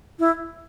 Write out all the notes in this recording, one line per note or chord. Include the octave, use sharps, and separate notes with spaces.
E4